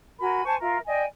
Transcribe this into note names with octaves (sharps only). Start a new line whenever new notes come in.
F#4 A#4 G#5 B5
C5 G#5 A5 C#6
F4 A#4 E5
D5 D#5 G5 G#5